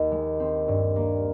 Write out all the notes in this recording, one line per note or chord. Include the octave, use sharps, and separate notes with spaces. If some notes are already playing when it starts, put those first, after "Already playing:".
Already playing: D#2
G#3
C4
G2
A#3